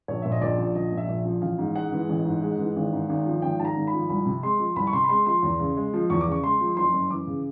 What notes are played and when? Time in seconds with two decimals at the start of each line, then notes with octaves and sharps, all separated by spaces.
0.08 A#1 C#5
0.22 A#2 E5
0.32 D#5
0.41 A#1 D5
0.58 F3
0.75 A#1 D#5
0.92 A#2
0.97 E5
1.08 A#1
1.25 F3
1.42 A1 F5
1.59 G#2
1.75 G#3 F#5
1.92 E3
2.09 A1
2.25 G#2
2.42 G#3
2.59 E3
2.76 G#1
2.93 G#2
3.09 G#1
3.26 F3
3.42 G#1 G5
3.59 G#2 A5
3.65 A#5
3.76 G#1
3.87 B5
3.93 F3
4.09 C2 B5
4.26 C3
4.43 G#3 C6
4.59 F3
4.76 C2 B5
4.87 C#6
4.93 C3 C6
5.04 B5
5.09 G#3 C6
5.26 F3 C6
5.43 E2
5.60 C#3
5.77 G#3
5.93 F3
6.10 E2 C#6
6.21 D6
6.27 C#3 C#6
6.43 G#3 C6
6.61 F3
6.77 F#1 C6
6.93 F#2
7.10 E3 D6
7.27 C#3